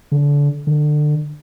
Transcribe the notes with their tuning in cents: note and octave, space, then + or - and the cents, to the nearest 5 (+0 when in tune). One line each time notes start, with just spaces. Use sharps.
D3 -30
D3 +25